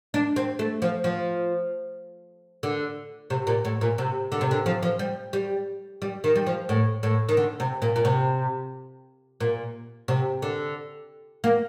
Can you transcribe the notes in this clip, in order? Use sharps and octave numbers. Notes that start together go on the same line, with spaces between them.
D4
C4
A3
F3
F3
D3
C3
A#2
A2
A#2
C3
D3
C3
D3
F3
F3
G3
G3
G3
D#3
G3
F3
A2
A2
D#3
D3
C3
A#2
A#2
C3
A#2
C3
D3
A#3